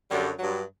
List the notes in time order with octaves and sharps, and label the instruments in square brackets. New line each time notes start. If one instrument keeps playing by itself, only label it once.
[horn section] F#2 D3 F#3 G3
G2 F#3